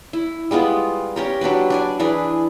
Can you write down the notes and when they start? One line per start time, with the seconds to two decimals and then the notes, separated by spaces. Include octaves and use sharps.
0.13 E4
0.51 G3 G#3 B3 F4
1.16 C#4 G4 A#4
1.41 F#3 D4 G4 B4
1.70 D4 D5 G#5
1.99 E3 D4 G#4 B4